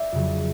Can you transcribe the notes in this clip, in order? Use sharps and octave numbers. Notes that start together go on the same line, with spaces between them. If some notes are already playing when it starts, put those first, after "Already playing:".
Already playing: D5 E5
F2 C#3 F#3